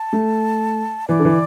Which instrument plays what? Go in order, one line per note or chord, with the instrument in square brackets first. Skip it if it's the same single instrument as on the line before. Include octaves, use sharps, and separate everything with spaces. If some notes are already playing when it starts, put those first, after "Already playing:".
Already playing: [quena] A5
[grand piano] A3
[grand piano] E3 [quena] D5
[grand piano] D3
E3